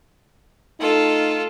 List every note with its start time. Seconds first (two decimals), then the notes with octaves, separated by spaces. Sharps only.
0.80 A3 D#4 F4 A4